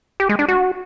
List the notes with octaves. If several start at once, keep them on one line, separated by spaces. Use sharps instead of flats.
G4
G#3
D4
F#4